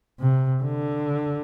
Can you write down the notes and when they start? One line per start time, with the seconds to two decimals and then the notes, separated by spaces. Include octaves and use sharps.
0.20 C3
0.63 D3